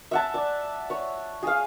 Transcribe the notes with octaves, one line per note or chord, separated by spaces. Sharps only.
E5 F#5 A5
D5
C#5
G#4 F5